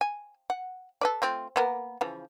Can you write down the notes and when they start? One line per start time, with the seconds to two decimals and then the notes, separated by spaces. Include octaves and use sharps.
0.01 G#5
0.50 F#5
1.01 A4 B4 D5
1.22 A3 C4 F4
1.56 A#3 B3 A#4
2.01 C#3 E3 F3